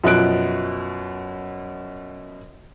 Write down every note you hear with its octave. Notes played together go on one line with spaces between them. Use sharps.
F#2 B2 F3 F#6 D7